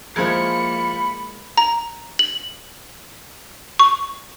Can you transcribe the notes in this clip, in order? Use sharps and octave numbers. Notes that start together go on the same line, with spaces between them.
F3 G#3 A#3 E4 A#4 B5 G#6 C#7
A#5
F#7
C#6